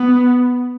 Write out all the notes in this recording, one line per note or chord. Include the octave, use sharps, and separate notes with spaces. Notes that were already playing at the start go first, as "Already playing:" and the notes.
Already playing: B3